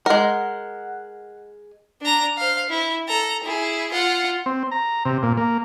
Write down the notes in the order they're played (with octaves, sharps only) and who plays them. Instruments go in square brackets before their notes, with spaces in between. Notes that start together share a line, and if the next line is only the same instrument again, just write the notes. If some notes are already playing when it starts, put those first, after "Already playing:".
[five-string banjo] G#3 A#4 [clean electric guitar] F#5
[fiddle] D4 A#5
C5 F5
E4
A4 A#5
E4 G#4
F4 F#5
[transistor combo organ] C4
A#5
C3
A#2
A#3